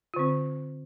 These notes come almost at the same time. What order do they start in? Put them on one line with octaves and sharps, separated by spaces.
F4 D3 C4